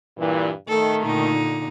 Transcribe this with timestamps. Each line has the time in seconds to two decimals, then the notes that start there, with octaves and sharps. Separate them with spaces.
0.18 G2 A#2 E3
0.69 D#3 A3 A4
1.04 A#2 D3 D#4